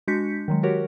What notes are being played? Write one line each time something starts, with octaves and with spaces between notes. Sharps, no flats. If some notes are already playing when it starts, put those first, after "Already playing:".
G#3 D4 F#4 G6 B6 C#7
D#3 F#3 G#3
F#4 G4 A#4 C#5 F#5